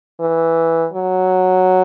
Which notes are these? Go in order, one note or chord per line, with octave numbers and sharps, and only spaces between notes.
E3
F#3